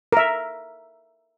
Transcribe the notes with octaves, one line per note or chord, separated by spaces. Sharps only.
A#4 E5